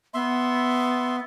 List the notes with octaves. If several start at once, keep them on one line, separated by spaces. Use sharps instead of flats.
B3 E5 C6